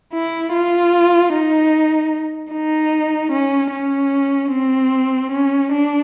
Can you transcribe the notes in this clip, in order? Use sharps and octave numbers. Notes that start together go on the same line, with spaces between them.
E4
F4
D#4
D#4
C#4
C#4
C4
C#4
D4